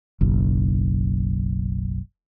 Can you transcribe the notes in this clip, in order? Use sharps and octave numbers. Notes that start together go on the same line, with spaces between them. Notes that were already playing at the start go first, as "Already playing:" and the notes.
F#1 B1